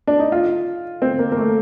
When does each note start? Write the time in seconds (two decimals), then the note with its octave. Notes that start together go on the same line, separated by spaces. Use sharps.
0.07 D4
0.19 D#4
0.32 F4
1.02 C4
1.19 A#3
1.32 A#3
1.37 A3